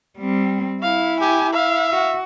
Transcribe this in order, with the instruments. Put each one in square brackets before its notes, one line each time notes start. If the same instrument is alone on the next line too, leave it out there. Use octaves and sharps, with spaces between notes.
[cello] G3 C4
[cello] E4 [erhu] F5
[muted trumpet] G4 [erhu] G#5
[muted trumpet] E5 [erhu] F5
[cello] F#4